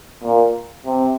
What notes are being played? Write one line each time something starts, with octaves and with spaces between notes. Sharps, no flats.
A#2
C3